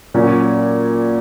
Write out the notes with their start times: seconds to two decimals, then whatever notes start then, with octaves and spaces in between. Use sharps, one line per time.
0.14 A#2 F#3 C#4